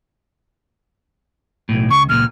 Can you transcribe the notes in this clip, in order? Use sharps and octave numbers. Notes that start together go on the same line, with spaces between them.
B1 A2
C#2 C#6
C#2 A#2 F6